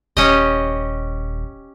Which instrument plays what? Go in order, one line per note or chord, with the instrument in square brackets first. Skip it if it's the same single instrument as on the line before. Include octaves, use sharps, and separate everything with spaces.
[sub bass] D#1 [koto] C#4 G4 D#5